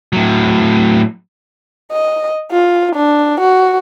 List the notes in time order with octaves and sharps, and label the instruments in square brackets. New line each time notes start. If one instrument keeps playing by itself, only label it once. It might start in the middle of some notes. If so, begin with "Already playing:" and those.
[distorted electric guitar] A2 F#3
[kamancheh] D#5
F4
D4
F#4